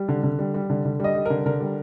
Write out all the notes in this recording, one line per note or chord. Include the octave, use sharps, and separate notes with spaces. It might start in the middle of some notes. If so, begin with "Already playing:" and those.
Already playing: G3
D3
D3
G3
G3
D3
D3
G3 D#5
G3
D3 A#4
D3 A#4
G3